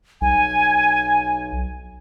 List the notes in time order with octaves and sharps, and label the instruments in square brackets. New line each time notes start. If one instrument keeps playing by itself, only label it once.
[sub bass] B1 [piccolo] G#5